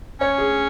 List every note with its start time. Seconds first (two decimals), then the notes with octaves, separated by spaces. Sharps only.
0.21 C#4 C#5
0.38 G#4